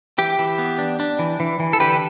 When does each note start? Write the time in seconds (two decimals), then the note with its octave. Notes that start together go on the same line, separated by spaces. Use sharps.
0.18 E3 G4
0.39 E3
0.58 B3
0.79 D4
1.00 D4
1.19 E3
1.40 E3
1.60 E3
1.73 A4
1.80 D3 G4 B4